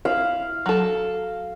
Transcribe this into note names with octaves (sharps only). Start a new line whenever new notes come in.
E4 F5
F#3 A4